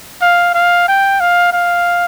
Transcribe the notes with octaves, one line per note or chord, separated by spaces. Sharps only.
F5
F5
G5
F5
F5